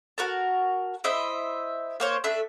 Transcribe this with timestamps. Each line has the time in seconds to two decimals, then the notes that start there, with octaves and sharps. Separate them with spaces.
0.18 F#4 A#4 A5
1.04 E4 C5 D#5 E5
2.00 A#3 C5 C#5
2.24 A3 D4 E5